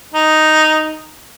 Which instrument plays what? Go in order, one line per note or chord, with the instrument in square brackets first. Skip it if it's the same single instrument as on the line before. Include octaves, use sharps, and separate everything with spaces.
[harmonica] D#4